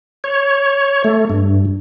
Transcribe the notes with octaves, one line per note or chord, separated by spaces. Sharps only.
C#5
A3
G2